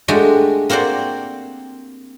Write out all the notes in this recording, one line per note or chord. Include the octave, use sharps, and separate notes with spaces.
G#3 A3 D4 F#4 G4
A#3 C4 F#4 C5 D5